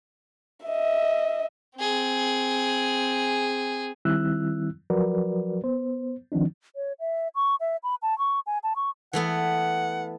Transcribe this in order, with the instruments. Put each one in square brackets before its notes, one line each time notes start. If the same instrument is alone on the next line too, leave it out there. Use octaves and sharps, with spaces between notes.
[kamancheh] D#5 E5
[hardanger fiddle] C4 G#4
[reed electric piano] D#3 G3 C4 E4 E6 F#6
F3 F#3 F#4 A#4 B4 D5
B3 C5
D#3 F3 C4 D4 D#4
[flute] C#5
E5
C#6
E5
B5
A5
C#6
G#5
A5
C#6
[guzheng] E3 A3 B3 [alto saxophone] F#5